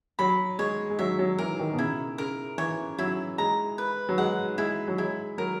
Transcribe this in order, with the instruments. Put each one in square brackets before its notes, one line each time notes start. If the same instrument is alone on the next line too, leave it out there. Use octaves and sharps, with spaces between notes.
[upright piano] F#3 [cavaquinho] B5
[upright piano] G#3 [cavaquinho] C#5
[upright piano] G#3
[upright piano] F#3 [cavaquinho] E5
[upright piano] F#3
[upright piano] E3 [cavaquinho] A#4
[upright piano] D#3
B2
[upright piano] C#3 [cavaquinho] E4
[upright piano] C#3 [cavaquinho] A#4
[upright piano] E3 [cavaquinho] C#5
[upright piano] F#3 [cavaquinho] E4
[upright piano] G#3 [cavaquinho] A#5
[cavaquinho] B4
[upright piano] F#3
[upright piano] G#3 [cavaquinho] F#5
[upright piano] G#3 [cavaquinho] E4
[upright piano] F#3
[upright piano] G#3 [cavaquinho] E4
[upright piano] F#3 [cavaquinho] A#4